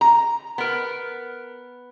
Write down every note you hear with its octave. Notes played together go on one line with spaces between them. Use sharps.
A#5
B3 A#4